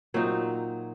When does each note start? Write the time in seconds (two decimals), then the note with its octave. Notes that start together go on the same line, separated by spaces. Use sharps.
0.14 A#2 F#3 C4 D#4